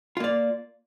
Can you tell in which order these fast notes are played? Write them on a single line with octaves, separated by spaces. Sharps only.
F4 A#3 D5